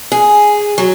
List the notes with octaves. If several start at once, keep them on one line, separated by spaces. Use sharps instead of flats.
G#4
F#3